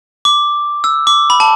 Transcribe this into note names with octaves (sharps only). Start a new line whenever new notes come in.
D6
E6
D6
B5
A5